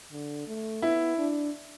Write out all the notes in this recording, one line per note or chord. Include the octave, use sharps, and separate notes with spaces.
D3
A3
B3 E4
D4